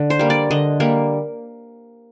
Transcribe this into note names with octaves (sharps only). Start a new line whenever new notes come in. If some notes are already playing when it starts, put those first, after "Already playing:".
Already playing: D3
C5
G3 A#3
D5
D3 D#5
G3 A#3